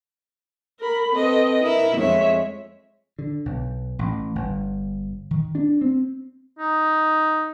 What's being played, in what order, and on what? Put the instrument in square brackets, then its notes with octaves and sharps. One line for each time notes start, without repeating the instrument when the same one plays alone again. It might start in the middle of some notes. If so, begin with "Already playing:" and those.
[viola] A#4 B5
[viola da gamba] C4 B4 [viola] A4 D#5
[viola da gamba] E4 [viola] A#4
[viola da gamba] F2 G#3 [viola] C#5 E5
[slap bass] D3
B1
A1
G1
D#3
D4
C4
[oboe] D#4